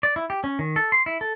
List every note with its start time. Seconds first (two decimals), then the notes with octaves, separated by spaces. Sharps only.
0.03 D5
0.16 E4
0.30 G4
0.44 C#4
0.59 D#3
0.76 A4
0.92 C6
1.06 E4
1.21 A4